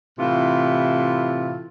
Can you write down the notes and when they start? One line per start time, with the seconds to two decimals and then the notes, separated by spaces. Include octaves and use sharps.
0.17 A2 C3 E3 F4